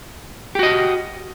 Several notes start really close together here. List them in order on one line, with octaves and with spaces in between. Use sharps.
G4 F#4 D#5